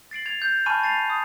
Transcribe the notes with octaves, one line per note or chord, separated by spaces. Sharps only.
A6 C7 D7 F#7
G#6 A6 F7
G6
G#5 A5 B5 C#6 F6 D#7
A6 C7 D#7 F7
D#6